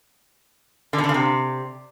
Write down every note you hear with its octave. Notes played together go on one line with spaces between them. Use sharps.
D3
B2
D3
C#3
C3